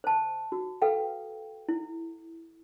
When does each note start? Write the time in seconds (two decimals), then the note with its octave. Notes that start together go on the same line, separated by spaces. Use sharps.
0.04 C5 A5
0.52 F#4
0.82 A4 B4 F5 G5
1.69 E4